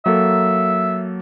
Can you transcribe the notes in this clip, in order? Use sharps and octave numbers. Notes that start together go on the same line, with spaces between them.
F#3 A#3 A4 E5